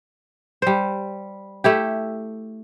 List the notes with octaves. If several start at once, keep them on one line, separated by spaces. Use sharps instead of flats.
G3 C5
A3 E4 G4